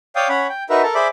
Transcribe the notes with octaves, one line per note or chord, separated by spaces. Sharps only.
C#5 D5 F5 G5 D#6
C#4 C#5 F#5 B5
G5
D#4 F#4 A#4 B4 E5
A4 A#4 A5
G#4 C5 D5 E5 B5 D6